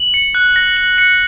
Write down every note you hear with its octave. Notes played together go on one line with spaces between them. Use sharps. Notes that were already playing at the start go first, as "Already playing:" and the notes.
Already playing: F#7
C#7
F#6
A#6
F#7
C#7